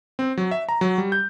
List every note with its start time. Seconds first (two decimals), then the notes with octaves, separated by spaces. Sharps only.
0.19 C4
0.37 F#3
0.51 E5
0.69 A#5
0.81 F#3
0.98 G3
1.12 G6